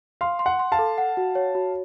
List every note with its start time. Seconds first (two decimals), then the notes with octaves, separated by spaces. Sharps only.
0.21 F5 C6
0.39 C6
0.46 F#5
0.59 C6
0.72 F5 A5
0.79 A4
0.98 F#5
1.17 F#4
1.35 C#5
1.55 F#4